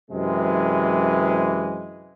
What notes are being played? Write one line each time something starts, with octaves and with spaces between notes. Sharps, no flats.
F#2 C3 E3 G#3